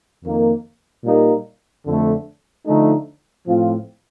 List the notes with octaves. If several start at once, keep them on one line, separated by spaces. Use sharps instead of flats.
F2 D#3 A#3
A#2 G3 A#3 D#4
F2 D3 A3
D3 F3 A3 D#4
A2 F3 C4 F4